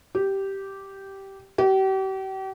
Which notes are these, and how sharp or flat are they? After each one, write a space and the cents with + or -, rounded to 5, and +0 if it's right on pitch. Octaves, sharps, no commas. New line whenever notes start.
G4 -10
G4 -40